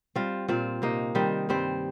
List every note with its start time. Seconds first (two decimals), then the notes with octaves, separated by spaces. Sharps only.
0.15 G3 C4 F4
0.48 A#2 C4 F4
0.82 C3 A#3 D#4
1.15 D#3 G3 C4
1.49 G2 G3 C4